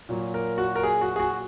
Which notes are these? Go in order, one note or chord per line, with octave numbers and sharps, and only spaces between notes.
A#2 F#3 A#3
A#4
F#4
A#4
G#4
F#4
G#4
F#4